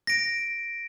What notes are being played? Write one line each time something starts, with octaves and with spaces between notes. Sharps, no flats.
A#6 D7